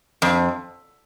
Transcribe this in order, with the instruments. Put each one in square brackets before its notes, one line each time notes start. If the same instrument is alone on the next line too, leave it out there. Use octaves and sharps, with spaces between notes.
[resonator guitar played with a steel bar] F2